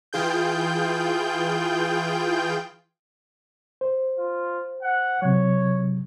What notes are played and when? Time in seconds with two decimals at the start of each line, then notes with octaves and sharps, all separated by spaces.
0.13 E3 F4 G#4 G5 G6
3.81 C5
4.18 F4
4.82 F#5
5.22 C3 F#3 C#5